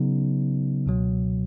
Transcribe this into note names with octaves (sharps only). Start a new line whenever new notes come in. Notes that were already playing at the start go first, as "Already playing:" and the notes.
Already playing: C#3 F#3 B3 D#4
C#2 B2 F#3